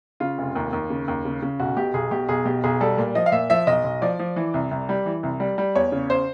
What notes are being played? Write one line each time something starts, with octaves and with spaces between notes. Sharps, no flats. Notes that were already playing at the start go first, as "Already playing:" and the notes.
C#3 F4
F1
D#2
D#2
C#3
D#2
C#3
C#3
B1 F#4
B2 G4
B1 G#4
B2 G4
B1 G#4
B2 G4
B1 G#4
G3 A4
A#2
F3 D#5
F5
A#2 E5
F3 E5
B1 D#5
B1
F3 D5
F3
E3
C2
C2
G3
E3
C2
G3
G3
E2 C#5
C#3
C5